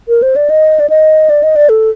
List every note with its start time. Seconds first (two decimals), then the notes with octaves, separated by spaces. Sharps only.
0.08 A#4
0.22 C5
0.36 D5
0.50 D#5
0.80 D5
0.90 D#5
1.30 D5
1.43 D#5
1.56 D5
1.69 A4